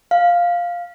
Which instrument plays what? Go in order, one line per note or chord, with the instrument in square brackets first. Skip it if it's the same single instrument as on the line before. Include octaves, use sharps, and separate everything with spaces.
[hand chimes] F5